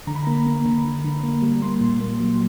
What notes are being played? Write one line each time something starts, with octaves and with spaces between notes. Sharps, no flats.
D3 A#5
B5
A#3 A#5
A#3
D3
D3
D3
A#3
G3
A#3 C6
A#2
A#3
F#3